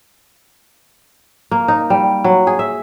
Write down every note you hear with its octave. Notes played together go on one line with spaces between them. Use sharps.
A#3
D#4
G3
F#3
G#4
E5